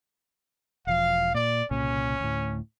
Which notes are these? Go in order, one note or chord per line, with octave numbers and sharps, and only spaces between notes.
E1 F3 F5
A#2 D5
C2 A#2 C#3 C#4
D2 A2